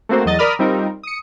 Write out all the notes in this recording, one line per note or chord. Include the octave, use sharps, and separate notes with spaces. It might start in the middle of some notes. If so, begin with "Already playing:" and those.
A3 A#3 C4 F#4 C5
E2 F#3 D#5 A6
A#4 D5 B5 D#6 F6
G3 C4 D#4 F4 A#4
D#6 C#7